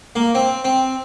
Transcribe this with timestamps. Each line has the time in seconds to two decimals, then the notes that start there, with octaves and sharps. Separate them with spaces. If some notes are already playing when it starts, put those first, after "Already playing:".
0.16 A#3
0.35 C4
0.64 C4